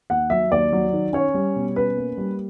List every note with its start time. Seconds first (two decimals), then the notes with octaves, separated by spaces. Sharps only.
0.10 D#2 F#5
0.30 F#3 E5
0.51 D#2 D5
0.73 F#3
0.93 D#3
1.13 C#4 C#5
1.34 G3
1.56 B2
1.76 C#4 B4
1.97 A#3
2.18 G3